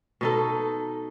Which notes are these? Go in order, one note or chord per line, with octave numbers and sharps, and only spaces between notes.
B2 D#4 A4